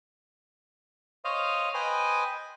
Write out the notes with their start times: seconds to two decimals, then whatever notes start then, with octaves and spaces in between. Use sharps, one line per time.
1.25 C5 C#5 D#5 F5
1.74 B4 C5 D#5 G5 G#5